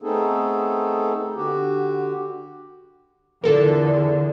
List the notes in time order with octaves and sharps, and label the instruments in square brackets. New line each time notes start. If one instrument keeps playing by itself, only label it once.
[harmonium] A3 B3 C4 D#4 G#4 A4
D3 F#4 G4
[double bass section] E2 D3 [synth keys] F4 A4 A#4